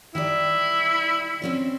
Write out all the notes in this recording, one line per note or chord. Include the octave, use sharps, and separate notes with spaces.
D#3 G3 E4 D5
C4 C#4 C5